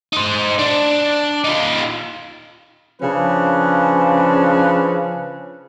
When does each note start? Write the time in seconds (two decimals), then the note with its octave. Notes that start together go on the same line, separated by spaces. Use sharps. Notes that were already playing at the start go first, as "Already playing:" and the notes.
0.13 D#4 C5
0.59 D4
1.44 D#4 F4
3.01 C#3 F3 C#4 D4 B4